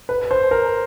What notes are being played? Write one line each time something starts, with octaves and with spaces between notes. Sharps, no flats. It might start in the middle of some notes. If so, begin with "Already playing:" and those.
B4
C5
A#4